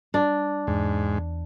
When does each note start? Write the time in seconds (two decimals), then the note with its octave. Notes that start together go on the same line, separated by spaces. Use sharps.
0.14 G3 D4
0.67 E2 G#2